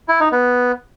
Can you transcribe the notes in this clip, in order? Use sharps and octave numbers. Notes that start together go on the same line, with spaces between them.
E4
D#4
B3